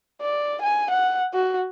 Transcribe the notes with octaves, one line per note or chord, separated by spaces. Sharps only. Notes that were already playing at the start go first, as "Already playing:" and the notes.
D5
G#5
F#5
F#4